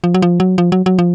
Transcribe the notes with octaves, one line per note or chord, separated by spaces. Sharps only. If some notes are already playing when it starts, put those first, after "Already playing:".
F3
F#3
F3
F#3
F3
F#3
F#3
F3